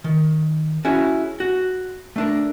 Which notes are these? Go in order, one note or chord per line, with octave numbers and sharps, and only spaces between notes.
D#3
C#4 E4 F#4 G#4
F#4
A3 D4 A#4